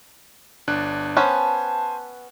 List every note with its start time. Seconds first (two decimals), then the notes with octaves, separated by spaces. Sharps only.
0.68 G1 D4 F#6
1.17 B3 C#4 C5 G#5 A5